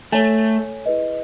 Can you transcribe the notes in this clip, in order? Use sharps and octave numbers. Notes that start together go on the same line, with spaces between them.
A3 A4 C#5 G#5
E4 G#4 B4 D#5